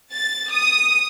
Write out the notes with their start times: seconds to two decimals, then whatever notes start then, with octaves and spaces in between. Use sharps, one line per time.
0.12 A6
0.51 D#6